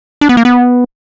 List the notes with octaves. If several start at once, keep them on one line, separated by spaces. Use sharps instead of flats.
D4
B3
A#3
B3